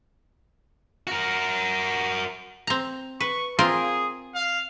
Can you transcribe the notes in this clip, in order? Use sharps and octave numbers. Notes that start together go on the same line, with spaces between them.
F#4 A#4
C4 A#5
B4 C#6
C4 F4 G#4 A#4
F5